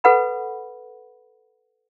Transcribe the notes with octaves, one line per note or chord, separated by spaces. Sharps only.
A4 B4 F#5 B5